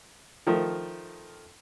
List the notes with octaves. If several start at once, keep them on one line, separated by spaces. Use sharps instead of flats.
D#3 F3 A3